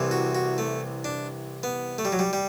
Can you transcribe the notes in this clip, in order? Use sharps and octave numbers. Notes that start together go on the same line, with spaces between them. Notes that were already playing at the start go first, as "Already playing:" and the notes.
Already playing: C2 C3 E3
F#4
F#4
A3
D4
B3
A3
G3
F#3
G3
G3